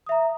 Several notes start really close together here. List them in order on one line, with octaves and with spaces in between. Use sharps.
D#6 E5 A#5